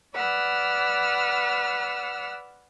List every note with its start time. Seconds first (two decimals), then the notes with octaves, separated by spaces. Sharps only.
0.16 B4 D5 F#5 E6 F6